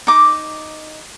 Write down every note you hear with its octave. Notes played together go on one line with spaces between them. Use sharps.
D#4 D6